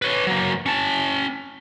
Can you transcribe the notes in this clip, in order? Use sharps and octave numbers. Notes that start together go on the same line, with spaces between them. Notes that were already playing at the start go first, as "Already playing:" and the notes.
B4 C#5
F#3 A#3
C#4 A5